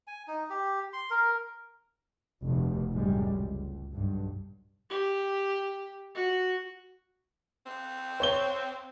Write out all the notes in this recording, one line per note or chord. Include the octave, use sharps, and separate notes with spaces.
G#5
D#4
G4
C6
A#4
F1 D#2 B2
C#2 F#2 A2 C3 G3 G#3
C#2
B1 G2
G4
F#4
C4
C5 C#5 G7